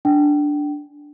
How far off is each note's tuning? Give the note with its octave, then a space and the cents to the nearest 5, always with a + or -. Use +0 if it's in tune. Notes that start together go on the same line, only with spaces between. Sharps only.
D4 +0 G5 -25